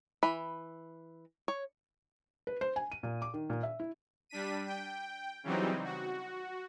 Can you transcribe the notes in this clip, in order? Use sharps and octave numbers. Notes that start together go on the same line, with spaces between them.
E3 B5
C#5
B4
C5
G#5
D#7
A#2
D6
D#3
A#2
E5
E4
G3 D4 B6 D#7
G5
C#3 E3 F#3 G3 C4 D#4
F#4